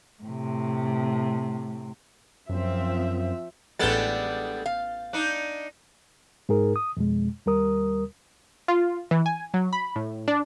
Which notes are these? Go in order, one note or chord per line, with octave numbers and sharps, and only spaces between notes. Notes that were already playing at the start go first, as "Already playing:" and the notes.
A2 C3
F#2 F3 C4 E5
A1 G3 G#3 B3 D4 A4 G6 A6
F5
D4 D#4
G#2 D#4 G#4 A#4
D#6
F2 B2 G#3
D#2 G3 A#4 D#6
F4
E3
G#5
F#3
B5
A2
D4